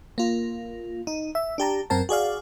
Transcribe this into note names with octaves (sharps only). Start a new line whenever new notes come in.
A#3 F4
D#4
E5
D4 G4 A5 A#5
F#2 C4 A#4 A5
F#4 G#4 D5 F5